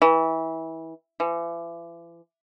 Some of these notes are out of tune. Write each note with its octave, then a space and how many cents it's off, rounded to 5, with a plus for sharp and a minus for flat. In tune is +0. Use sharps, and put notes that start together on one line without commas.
E3 -25
E3 +40